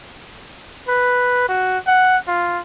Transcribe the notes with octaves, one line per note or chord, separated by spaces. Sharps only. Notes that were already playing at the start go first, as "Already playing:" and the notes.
B4
F#4
F#5
F4